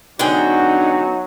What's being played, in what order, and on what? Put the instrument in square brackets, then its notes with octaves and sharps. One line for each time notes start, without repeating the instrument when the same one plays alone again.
[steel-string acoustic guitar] D3 G#4 G5 [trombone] F#3 [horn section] B3 C#4 F#4 [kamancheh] D#4